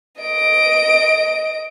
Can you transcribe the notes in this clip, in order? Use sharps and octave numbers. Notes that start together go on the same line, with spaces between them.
D#5 D7